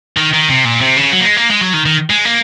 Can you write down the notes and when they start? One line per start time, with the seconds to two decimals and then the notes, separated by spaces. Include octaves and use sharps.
0.17 D#3
0.33 D#3
0.49 C3
0.65 A#2
0.81 C3
0.97 C#3
1.13 F#3
1.21 A#3
1.25 G#3
1.37 A#3
1.50 G#3
1.61 F#3
1.73 D#3
1.86 D#3
2.10 G#3
2.25 A#3